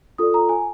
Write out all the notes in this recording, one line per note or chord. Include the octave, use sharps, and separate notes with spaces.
F4 A4 D5 D#6
A#5
G#5